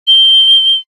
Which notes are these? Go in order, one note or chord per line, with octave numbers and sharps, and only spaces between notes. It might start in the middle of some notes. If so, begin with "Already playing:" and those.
G7